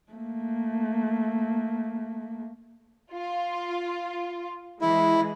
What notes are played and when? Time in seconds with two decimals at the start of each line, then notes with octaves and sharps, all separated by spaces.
0.12 A3 A#3
3.12 F4
4.81 E3 G#3 E4